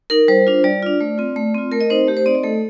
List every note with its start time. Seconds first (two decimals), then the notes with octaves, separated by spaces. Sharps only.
0.10 D#4 A#4
0.28 G3 C5
0.47 D4 F4
0.64 G3 D5
0.83 D4 F4
1.01 A3
1.18 C4 F4
1.36 A3
1.55 C4 F4
1.72 A3 A#4
1.81 D#5
1.90 C4 D#4 C5
2.08 A3 G4
2.17 C5
2.26 C4 D#4 D5
2.35 D#5
2.43 A3 A4